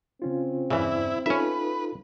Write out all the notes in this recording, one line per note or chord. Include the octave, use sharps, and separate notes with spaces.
C#3 C4 C#4 F4
E2 G2 C#3 E3 E4 D5
C#4 D#4 F4 A4 B4 E5